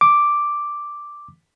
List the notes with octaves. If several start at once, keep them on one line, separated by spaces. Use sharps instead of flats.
D6